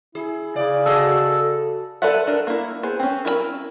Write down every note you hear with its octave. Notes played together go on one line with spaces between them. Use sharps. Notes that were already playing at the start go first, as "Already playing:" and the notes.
E4 G#4
C#3 D5
F#4 G#4 A4 D#5
A4 B4 D5 E5 F#5
D4 A#4
A#3 E4
B3 G#4 C5
C4 C#4
E4 A#4 B4 B5